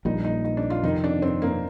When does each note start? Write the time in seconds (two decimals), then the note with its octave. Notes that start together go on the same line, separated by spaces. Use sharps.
0.05 A#1 A#2 G3 D#4
0.25 D#4
0.45 D#4
0.57 D4
0.70 F4
0.83 F2 C3 D#3 D#4
1.04 D4
1.22 C4
1.42 A#3